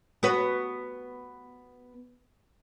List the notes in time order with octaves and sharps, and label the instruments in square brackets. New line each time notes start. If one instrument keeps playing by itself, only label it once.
[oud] B3 F#4 B4